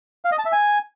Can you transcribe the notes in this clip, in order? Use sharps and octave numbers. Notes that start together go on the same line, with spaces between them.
F5
D#5
A5
E5
G#5